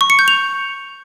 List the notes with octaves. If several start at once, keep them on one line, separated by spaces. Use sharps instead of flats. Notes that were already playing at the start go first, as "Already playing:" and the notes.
C#6
C#7
G6
F7